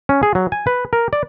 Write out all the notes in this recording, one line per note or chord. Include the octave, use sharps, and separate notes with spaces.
C#4
G#4
F#3
G#5
B4
A#4
D5